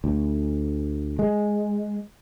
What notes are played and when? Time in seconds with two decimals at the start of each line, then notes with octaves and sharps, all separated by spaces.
0.04 D2
1.19 G#3